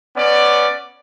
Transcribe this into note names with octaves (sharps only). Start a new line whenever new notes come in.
B3 C#4 D5